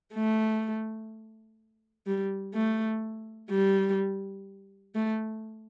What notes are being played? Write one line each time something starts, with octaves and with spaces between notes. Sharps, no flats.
A3
G3
A3
G3
A3